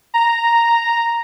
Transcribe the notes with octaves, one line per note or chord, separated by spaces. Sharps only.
A#5